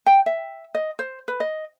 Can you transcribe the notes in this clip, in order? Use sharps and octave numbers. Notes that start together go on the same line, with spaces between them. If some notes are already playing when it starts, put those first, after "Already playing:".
G5
E5
D#5
C5
B4
D#5